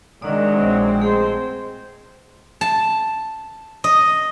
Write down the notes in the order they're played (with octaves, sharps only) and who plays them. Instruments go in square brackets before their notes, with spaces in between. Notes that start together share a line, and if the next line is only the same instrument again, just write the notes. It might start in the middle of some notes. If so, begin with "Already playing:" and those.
[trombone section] C3 F#3 [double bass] D#3 [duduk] G#3 [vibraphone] D4 D5
[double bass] A#1 C4
[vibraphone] A3 G#4 [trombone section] C5
[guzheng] A5
D#5